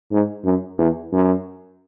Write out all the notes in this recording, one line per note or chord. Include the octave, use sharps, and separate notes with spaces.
G#2
F#2
E2
F#2